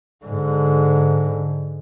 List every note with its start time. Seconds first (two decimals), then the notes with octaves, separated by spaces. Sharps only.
0.25 G#2 D3